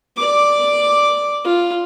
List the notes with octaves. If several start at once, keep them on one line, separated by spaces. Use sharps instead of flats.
D5 D6
F4